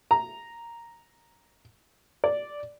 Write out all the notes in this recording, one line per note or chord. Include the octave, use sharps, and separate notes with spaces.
A#5
D5